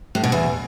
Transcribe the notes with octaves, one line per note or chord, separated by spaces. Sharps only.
A2
B2
E2